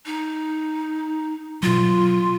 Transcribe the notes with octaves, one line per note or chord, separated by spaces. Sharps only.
D#4
B2 F#3 F4